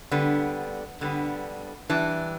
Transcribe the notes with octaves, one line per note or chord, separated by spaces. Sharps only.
D3 G3 B3
D3 G3 B3
E3 G3 D4